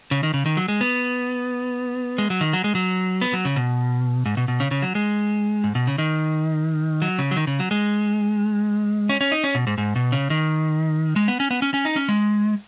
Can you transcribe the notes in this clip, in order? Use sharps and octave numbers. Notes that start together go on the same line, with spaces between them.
C#3
D#3
C#3
D#3
F#3
G#3
B3
G#3
F#3
D#3
F#3
G#3
F#3
B3
F#3
C#3
B2
G#2
B2
B2
C#3
C#3
F#3
G#3
G#2
B2
C#3
D#3
F#3
C#3
F#3
D#3
C#3
F#3
G#3
C#4
C#4
D#4
C#4
B2
G#2
G#2
B2
C#3
D#3
G#3
B3
C#4
B3
C#4
C#4
D#4
C#4
G#3